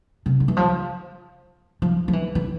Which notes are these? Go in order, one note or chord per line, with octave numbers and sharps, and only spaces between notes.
C3
D3
E3
F3
F3
F3
E3
E3